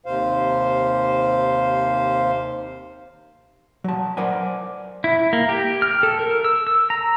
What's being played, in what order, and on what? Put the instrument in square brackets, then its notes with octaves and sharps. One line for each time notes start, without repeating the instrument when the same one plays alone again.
[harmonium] D#2 C3 C5 F5
[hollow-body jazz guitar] F#3 A5
A#4 C5 D5 F#5 G#5
[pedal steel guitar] E4
A#3
G4
F6
A4
A#4
E6
E6
A#5